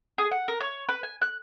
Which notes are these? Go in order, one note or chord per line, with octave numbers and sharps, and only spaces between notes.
G#4
F#5
A#4
C#5
B4
G#5
F#6